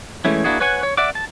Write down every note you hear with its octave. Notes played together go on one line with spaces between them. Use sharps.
E3 G#3 A3 C#4 E4
A#3 D4 E4 F#4 G#4
B4 C#5 F#5 G#5 C#6
C#5
D5 E5 F#5 D6
A5